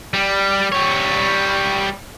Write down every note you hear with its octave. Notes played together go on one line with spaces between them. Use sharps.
G3
G3 C#5